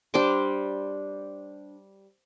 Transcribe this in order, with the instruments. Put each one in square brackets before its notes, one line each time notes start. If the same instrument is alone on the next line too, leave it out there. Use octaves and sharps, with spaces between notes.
[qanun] G3 D4 C5 D6